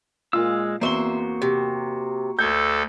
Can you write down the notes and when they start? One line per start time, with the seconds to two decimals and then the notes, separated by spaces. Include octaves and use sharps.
0.33 A#2 G#3 F4 E6
0.81 E2 A#3 C4 F#4 C5 E5 G7
1.42 C3
2.39 D2 A4 G6 G#6